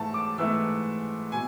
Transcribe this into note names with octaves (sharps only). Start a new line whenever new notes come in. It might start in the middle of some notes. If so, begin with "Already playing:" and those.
Already playing: G#2 E3 A3 A5
D6
G#2 E3 A3 E6
B2 G#5